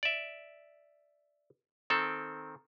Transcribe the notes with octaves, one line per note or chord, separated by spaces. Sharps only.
D5 E5
D#3 C4 A4